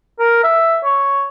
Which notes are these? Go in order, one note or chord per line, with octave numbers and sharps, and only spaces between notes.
A#4
E5
C#5